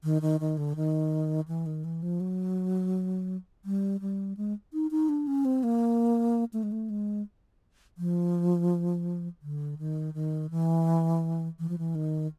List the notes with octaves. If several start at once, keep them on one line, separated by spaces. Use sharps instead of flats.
D#3
D#3
D#3
D3
D#3
E3
D#3
E3
F3
F#3
G3
G3
G#3
D#4
D#4
D4
C#4
C4
A#3
A3
G#3
A3
G#3
F3
D3
D#3
D#3
E3
E3
F3
E3
D#3